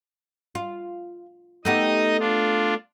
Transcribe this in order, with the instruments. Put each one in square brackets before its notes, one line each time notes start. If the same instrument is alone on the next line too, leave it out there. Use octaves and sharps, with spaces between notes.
[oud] F4
[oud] A3 B3 G4 [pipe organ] D#4 D#5 D#6
[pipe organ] D4 F4